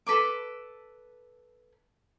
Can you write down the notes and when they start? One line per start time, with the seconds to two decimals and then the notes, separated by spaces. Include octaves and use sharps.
0.07 A4 B4 C6 D6